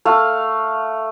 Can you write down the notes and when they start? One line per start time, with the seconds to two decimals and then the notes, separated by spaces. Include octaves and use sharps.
0.05 A3 F5